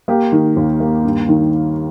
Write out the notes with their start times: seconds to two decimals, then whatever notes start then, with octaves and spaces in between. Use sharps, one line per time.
0.08 A#3 G4
0.32 D#3
0.56 D#2
0.80 A#3
1.05 G2
1.29 D#3